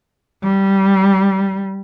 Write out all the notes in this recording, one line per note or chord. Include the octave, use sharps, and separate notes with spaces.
G3